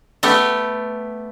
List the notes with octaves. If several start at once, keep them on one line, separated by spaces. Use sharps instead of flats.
A3 B3 G4